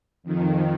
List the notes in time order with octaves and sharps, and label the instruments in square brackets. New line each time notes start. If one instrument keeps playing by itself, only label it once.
[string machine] F2 D#3